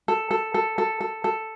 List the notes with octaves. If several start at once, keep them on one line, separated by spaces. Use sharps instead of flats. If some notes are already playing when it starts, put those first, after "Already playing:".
A4
A4
A4
A4
A4
A4